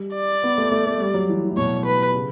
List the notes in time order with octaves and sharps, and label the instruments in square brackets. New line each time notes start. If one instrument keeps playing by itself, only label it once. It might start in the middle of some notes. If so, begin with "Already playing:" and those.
Already playing: [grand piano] G3
[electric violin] D5
[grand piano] B3
A3
A3
A3
G3
F#3
E3
E3
A2
[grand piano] B2 [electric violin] C#5
[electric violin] B4
[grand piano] C#3